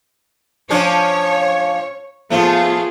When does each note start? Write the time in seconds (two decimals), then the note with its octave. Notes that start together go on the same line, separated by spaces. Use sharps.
0.70 F3 C#4 D4 C#5
2.30 F3 A3 B3 F4 G#4